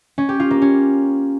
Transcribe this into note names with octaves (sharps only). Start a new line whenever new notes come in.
C#4
G4
F4
A#3
C#4